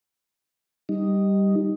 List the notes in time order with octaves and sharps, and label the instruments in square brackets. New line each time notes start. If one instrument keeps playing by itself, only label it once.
[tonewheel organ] G3 D#4